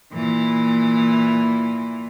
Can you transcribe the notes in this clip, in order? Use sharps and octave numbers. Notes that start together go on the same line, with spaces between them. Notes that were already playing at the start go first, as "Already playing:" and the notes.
A#2 E3